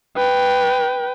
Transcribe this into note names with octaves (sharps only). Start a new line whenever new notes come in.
B4 G5